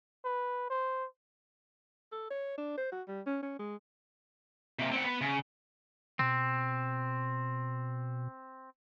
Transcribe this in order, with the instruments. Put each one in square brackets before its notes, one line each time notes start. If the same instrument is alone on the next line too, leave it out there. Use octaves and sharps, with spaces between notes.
[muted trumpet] B4
C5
[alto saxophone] A4
C#5
D4
C5
F#4
G3
C#4
C#4
G#3
[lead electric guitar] C3 A#3
C4 F#5
B3
C#3
[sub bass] B2 [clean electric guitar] C4